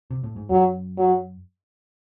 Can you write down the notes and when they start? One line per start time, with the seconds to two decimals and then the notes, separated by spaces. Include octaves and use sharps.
0.10 C3
0.23 A2
0.36 G#2
0.50 F#2 F#3
0.98 F#3